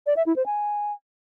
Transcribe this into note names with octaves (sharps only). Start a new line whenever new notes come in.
D5
E5
E4
C5
G#5